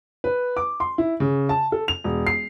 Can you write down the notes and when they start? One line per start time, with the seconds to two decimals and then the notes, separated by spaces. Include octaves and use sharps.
0.24 B4
0.57 D6
0.80 C6
0.98 E4
1.20 C#3
1.49 A5
1.72 A4
1.88 F7
2.04 E1
2.27 C7